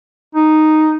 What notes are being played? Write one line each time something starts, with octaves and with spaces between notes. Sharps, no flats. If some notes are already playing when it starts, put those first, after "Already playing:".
D#4